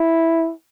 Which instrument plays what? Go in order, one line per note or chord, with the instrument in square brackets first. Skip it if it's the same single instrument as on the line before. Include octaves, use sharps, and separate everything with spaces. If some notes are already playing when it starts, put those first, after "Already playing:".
Already playing: [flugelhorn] E4